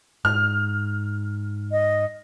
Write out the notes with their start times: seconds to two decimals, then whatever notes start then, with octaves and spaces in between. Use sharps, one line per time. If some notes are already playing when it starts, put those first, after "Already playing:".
0.25 G#2 F6
1.72 D#5